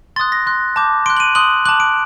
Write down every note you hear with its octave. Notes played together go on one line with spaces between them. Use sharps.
C6 D#6 F#6 A6
A#6
C6 F#6
A5 D6 G6
C6 F#6 D7
F#7
D#7
C6 D#6 F#6 F#7
A5 D6 F#6 F#7
D7